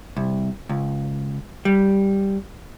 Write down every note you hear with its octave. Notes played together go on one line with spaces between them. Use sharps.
C2
C#2
G3